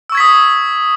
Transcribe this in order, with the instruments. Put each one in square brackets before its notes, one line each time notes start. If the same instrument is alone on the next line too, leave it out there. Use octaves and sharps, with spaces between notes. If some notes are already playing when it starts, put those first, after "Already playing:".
[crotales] E6
C#6
G#6
B6
D#6